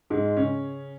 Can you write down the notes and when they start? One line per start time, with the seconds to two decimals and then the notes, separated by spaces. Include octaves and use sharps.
0.10 G#2 G#3
0.37 C#3 C#4